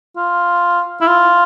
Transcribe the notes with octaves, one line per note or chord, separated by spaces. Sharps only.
F4
E4
F4